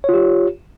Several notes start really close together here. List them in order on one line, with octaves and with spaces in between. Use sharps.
C#5 F4 G4